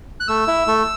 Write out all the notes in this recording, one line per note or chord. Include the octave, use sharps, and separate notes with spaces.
F#6
A3 E6
E4
A3